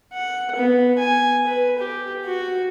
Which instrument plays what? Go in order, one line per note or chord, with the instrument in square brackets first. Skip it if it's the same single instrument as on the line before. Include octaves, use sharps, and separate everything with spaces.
[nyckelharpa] F#5
B3
G#5
B4
G4
F#4